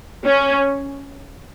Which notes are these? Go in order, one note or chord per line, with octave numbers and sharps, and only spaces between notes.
C#4